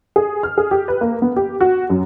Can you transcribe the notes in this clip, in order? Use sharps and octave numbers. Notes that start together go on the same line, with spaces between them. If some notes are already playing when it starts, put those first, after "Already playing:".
G#4
F6
G#4
G4
B4
A#3
B3
G4
F#4
F#2